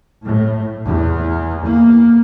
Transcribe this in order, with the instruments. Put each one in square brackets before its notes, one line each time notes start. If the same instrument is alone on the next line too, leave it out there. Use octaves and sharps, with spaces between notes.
[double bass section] A2
E2
A#3